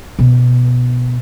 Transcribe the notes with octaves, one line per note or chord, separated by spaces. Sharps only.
B2